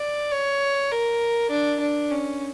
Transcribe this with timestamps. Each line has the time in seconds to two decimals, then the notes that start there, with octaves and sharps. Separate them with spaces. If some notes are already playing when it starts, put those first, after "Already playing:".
Already playing: D5
0.31 C#5
0.92 A#4
1.50 D4
1.80 D4
2.11 C#4